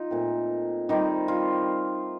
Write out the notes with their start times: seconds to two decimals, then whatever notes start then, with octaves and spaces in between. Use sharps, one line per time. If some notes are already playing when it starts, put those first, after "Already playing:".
Already playing: D#4 F4
0.10 A#2 A3 C4
0.89 D#3 G3 C4 D#4
1.28 F4